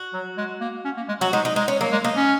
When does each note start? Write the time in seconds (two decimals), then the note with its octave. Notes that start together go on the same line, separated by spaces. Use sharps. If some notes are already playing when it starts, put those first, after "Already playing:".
Already playing: F#4
0.13 F#3
0.37 G#3
0.61 A#3
0.85 C#4
0.97 A#3
1.08 G#3
1.21 F#3 F#4
1.33 G#3 D#4
1.45 D#4
1.56 G#3 D#4
1.68 C#4
1.80 F#3 A#3
1.92 G#3
2.04 A#3 D#4
2.16 C#4